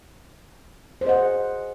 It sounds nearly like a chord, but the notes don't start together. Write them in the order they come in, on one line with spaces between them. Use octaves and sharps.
C5 G#4 D#5 F#5